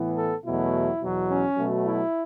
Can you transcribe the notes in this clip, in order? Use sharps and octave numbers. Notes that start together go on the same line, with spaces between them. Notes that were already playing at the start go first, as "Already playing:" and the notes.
Already playing: A2 E3 B3
A4
E2 B2 F#3 A3 E4
E2 B2 F#3
C#4
B2 F#3 A3
E4